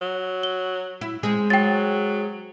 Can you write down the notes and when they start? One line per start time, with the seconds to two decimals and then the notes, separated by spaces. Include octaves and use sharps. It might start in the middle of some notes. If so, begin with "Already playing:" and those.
0.01 F#3
0.43 G7
1.01 E4
1.23 G#3 C4 G#4
1.50 F#3 G5 A6